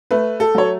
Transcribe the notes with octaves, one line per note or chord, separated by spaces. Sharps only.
A3 B4
A4
F#3 C#5